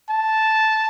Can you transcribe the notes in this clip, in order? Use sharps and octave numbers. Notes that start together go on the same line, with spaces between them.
A5